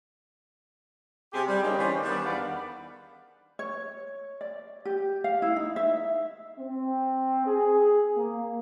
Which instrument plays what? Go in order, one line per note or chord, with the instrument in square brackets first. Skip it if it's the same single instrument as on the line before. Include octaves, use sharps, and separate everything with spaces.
[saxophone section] C3 G4 G#4
G3
D3 A#3 C4 C#4 D#4 G#4
E3 G3 C#4 B4 C5 D5
D#3 G3 B3 D4
E2 D#3 B4 D5 F5 F#5
[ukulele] C#5
D5
G4
F5
E4
D#4
E5
[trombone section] C4
G#4
A#3